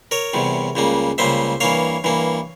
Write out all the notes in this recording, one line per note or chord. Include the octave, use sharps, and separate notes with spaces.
A#4 C#5
E2 C3 G3
C#2 C#3 G3 A#3
C#2 C#3 G3 A#3 C5 E5
G2 E3 A#3 C#5 F5
G2 E3 A#3